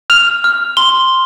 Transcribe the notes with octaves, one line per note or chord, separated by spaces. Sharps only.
F6 F7
F6
C6 G7